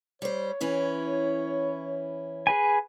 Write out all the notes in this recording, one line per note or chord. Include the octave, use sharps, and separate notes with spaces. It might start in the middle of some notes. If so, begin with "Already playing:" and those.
G3 C5 C#5
E3 C#4 E4
G#4 B4 G#5